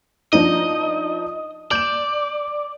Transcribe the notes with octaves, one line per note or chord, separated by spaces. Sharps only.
F3 D4 D#4 D#5
D5 G6 E7